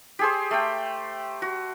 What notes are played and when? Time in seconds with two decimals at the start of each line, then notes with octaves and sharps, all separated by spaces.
0.19 G4 G#4 C5
0.51 A3 G5
1.42 F#4